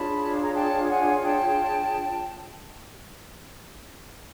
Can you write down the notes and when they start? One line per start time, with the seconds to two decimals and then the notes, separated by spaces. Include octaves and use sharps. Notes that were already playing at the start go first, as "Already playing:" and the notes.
Already playing: D4 F4 G#4 C#5 A5 B5
0.42 A#5
0.54 G5 A5
0.89 F#5 G#5
1.24 G5 A5